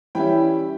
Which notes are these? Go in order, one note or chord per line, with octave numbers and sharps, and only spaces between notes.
E3 G3 C#4 E4 G5 B5